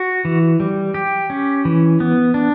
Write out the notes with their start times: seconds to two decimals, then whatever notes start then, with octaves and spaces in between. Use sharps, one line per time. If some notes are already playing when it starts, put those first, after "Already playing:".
Already playing: F#4
0.25 E3
0.60 G3
0.94 G4
1.30 C#4
1.65 E3
2.00 B3
2.34 D4